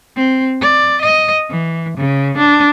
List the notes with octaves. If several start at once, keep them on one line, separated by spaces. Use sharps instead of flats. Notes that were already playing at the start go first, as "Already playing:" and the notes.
C4
D5
D#5
E3
C#3
D4